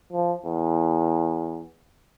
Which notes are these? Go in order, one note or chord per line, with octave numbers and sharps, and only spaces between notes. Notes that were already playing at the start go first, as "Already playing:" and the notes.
F3
E2